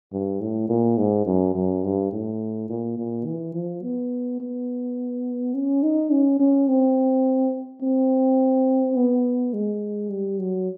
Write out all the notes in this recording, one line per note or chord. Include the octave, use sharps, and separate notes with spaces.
G2
A2
A#2
G#2
F#2
F#2
G2
A2
A#2
A#2
E3
F3
B3
B3
C#4
D#4
C#4
C#4
C4
C4
B3
G#3
G3
F#3